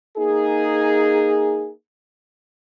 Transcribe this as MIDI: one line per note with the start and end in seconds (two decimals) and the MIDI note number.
0.17 1.69 58
0.17 1.69 63
0.17 1.69 68